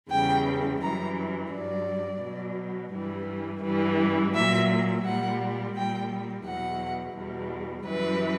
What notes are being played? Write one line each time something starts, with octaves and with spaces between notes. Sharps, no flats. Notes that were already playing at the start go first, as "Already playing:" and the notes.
E2 C#3 G3 G5
F#2 E3 G3 A#5
G2 F#3 D5
B2 F#3
G2 E3 G3
G2 E3 G3
A#2 F#3 E5
A#2 G3 F#5
A#2 G3 G5
E2 B2 F#3 F#5
E2 B2 G3
F#2 E3 G3 B4